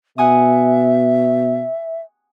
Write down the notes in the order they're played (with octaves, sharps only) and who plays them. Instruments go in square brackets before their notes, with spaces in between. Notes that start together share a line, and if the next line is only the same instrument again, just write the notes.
[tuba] B2 [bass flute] E5 [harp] F#5 G#5 D#6